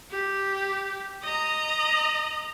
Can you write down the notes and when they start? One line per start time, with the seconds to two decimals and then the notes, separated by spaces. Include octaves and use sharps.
0.11 G4
1.23 D#5 A#5